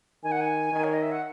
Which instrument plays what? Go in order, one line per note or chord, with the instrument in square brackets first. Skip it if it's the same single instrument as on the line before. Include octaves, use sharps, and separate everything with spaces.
[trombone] D#3 [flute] G#5
[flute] F#5
G#5
[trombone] D#3
[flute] C#5
D#5
E5
F#5